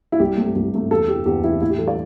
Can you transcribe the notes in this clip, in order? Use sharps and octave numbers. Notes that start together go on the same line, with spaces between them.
E4
C2 G4
C3 A3
C2
C3 A3
E2 A4
C3 E3 G4
E2 G4
C3 E3 E4
A2 E4
G4
E3 G3 A4
D5